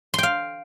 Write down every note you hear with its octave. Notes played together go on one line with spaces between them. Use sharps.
F5 G5 C6